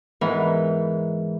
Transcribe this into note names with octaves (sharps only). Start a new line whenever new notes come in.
G#2 E3 B3 A#4 B4